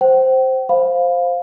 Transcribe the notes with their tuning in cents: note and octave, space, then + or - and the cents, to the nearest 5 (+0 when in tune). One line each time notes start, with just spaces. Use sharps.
C5 +0 G5 -40
C5 +0 F5 +10 B5 +0